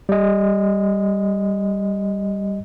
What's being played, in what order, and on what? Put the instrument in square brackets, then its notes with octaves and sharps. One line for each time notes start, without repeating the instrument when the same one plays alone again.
[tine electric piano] G3 D#5